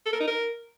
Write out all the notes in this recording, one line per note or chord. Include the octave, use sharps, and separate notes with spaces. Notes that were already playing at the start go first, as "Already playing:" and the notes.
A4
A#4
D#4
A#4